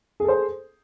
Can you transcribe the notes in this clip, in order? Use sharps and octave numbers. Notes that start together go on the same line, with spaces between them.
G#4 A4 C5